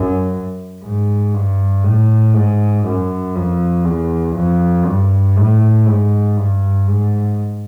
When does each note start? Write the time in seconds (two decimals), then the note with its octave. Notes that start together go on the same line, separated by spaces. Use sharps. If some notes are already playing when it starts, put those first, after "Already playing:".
Already playing: F#2
0.84 G#2
1.34 G2
1.84 A2
2.34 G#2
2.85 F#2
3.35 F2
3.85 E2
4.35 F2
4.86 G2
5.37 A2
5.87 G#2
6.37 G2
6.88 G#2